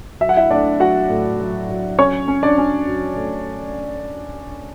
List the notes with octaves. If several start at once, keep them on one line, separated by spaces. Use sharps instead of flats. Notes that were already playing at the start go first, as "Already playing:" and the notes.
F#3 E5
F#5
E4 E5
A3 D4 D5
F#3 F#4 F#5
A2
F#3
F#3
C#4 C#5 C#6
C#4
D4 D5
C#4
F#3
A3